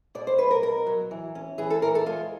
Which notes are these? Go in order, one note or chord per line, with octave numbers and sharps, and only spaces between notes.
B2 D5
C5
F#3 B4
A#4
B2 A#4
F#3
E3
C#4
E3 G#4
A4
E3 A#4
A4
G#3 F4